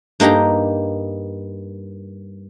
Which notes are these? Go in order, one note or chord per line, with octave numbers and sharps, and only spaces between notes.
G2 A#3 D#4 G4 A#5